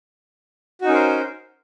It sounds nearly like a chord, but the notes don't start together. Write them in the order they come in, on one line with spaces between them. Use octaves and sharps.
F#4 D#4 C#4 A#4 C5